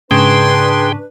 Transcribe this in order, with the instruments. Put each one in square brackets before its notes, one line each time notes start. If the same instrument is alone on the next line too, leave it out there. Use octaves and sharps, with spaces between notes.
[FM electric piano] G#2 C#3 [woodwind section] D4 B4 [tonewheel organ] G#4 G5 [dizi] C6